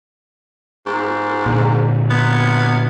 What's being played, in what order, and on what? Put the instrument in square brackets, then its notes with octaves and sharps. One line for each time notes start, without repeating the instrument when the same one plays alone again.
[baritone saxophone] G#2
[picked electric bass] A#2 D3
[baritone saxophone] B3